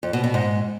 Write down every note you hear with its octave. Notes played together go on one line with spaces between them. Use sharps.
F2
B2
B2
G#2